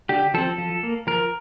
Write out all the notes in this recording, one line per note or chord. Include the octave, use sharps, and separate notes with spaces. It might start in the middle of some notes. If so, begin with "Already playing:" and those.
D3 G4
F3 C4 A4
F3
A#3
F3 A#4